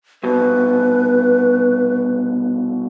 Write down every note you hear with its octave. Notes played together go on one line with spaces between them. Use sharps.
C2 B2 B4